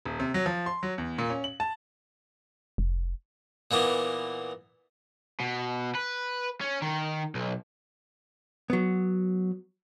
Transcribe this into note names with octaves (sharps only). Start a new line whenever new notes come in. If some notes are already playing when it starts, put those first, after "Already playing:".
D#1
C3
F#3
F3
C6
F#3
E2
A#2
C#4
F#7
A5
F1
A#2 E3 A#3 B3
B2
B4
C#4
D#3
B1
F#3 B3